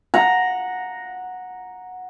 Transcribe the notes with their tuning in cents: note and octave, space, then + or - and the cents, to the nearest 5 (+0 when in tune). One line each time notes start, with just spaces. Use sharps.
F#5 -10 A#5 +0